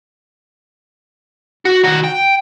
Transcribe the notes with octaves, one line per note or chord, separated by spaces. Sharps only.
F#4
D#3 F#4
G5